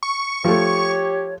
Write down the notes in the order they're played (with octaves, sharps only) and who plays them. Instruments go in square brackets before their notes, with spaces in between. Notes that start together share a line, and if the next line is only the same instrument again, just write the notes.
[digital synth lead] C#6
[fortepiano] F3 A3 [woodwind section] G4 C#5